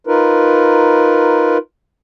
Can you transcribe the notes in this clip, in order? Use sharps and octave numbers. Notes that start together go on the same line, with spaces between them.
D#4 F4 A#4 B4